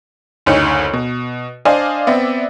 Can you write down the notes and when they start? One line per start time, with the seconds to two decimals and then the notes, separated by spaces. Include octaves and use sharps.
0.46 F#1 D2 D#4 C#5 C#7
0.93 B2
1.65 D4 C5 D5 D#5 F5 G#5
2.07 B3 C4 D5 E5